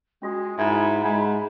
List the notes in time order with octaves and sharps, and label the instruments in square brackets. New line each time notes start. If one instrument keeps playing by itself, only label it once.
[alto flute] G#3 [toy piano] C#4 F4 F#4
[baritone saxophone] G#2 [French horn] E4 [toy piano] E5 [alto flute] B5
[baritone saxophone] G#2 [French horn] G#3 [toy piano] F#5